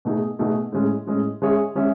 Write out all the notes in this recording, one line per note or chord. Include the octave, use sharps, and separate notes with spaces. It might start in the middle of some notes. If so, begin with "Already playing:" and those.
B2 A3 D#4 G#4
B2 A3 D#4 G#4
A2 G#3 C#4
A2 G#3 C#4
G#3 C#4 G#4 C#5 E5
G#3 C#4 G#4 C#5 E5